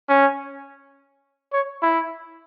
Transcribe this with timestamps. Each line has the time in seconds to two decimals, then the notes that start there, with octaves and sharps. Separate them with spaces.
0.09 C#4
1.53 C#5
1.82 E4